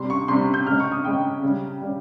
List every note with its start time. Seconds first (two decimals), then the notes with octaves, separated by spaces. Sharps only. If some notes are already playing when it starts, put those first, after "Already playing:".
Already playing: C3 G3 C6
0.10 C#6
0.28 C3 G3 C6
0.54 G6
0.66 C#3 F6
0.71 G#3
0.80 C#6
0.92 D#6
1.05 C#3 G#3 G5
1.43 C#3 G3
1.81 C#3 G3